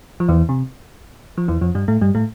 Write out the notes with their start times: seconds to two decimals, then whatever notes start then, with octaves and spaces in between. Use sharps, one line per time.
0.20 F3
0.28 E2 E3
0.49 C3
1.38 F3
1.48 E2 E3
1.61 F2 F3
1.75 G2 G3
1.88 A2 A3
2.01 G2 G3
2.15 A2 A3